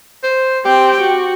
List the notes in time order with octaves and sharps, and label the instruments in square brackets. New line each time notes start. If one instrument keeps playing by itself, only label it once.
[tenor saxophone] C5
[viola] C4 G5 [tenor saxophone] G4
[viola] F#4